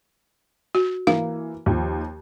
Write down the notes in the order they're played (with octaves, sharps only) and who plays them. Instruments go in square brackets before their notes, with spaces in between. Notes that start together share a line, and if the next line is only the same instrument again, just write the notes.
[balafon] F#4
[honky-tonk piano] E3 A#3 [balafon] F5
[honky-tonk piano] D#2 F3